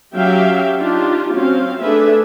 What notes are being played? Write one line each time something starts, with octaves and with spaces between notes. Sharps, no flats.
F#3 C#4 G4 E5 F5 G5
D4 D#4 F4 G4
F#3 C4 C#4 F#4 F5
A3 D4 G#4 A4 B4 E5